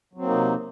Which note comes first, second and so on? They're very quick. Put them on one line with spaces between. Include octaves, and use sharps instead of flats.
F#3 C4 A#3 D#4 C3